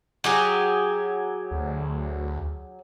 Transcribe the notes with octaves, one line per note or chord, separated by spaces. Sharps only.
F#3 G4 G#4
D2